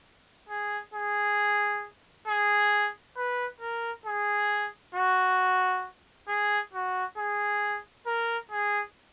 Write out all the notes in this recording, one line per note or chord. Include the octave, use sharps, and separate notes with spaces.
G#4
G#4
G#4
B4
A#4
G#4
F#4
G#4
F#4
G#4
A#4
G#4